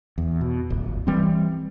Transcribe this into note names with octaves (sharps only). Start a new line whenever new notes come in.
E2
B2
D1 G1
E3 G3 C4